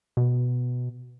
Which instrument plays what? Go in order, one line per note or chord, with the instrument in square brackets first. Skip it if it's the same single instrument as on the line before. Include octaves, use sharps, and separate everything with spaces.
[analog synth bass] B2